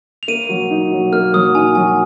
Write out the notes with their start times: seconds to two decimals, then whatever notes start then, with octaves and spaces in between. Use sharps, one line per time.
0.23 F7
0.28 A#3 D#7
0.49 F#3
0.70 D#4
0.91 F#3
1.13 A#3 F6
1.34 F#3 D#6
1.55 D#4 G#5
1.75 F#3 G#5